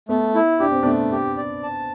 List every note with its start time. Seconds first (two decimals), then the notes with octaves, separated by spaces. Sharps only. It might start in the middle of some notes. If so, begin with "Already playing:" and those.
0.09 A3 B3
0.35 E4
0.60 D4 G4
0.71 C4
0.83 A3 B3 D4
1.12 G4
1.37 D5
1.63 A5